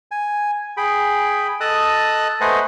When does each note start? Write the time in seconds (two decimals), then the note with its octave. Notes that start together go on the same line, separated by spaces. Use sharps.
0.11 G#5
0.77 G#4 G5 B5
1.61 A4 D#5 A5 D#6 F#6
2.41 A3 B4 C5 D#5 F#5 G#5